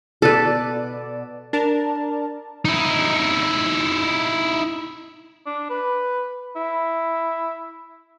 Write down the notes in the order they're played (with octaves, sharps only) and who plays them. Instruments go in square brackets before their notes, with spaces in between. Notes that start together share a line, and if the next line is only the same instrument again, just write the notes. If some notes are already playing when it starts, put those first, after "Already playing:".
[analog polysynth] B2 D5 [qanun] A4 B4
[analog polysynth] D4 A#4 A5
[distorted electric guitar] D#4 E4
[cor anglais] D4
B4
E4